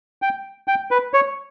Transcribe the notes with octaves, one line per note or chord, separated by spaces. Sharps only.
G5
G5
B4
C#5